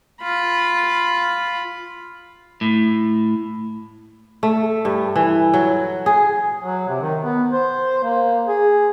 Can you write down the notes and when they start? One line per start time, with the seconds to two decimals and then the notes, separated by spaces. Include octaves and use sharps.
0.22 F4 B5
2.61 A2
4.43 A3
4.85 G2
5.16 E3
5.54 F#3
6.06 G#4
6.61 F#3
6.89 C3
7.02 D#3
7.23 B3
7.52 C5
8.04 A#3
8.48 G#4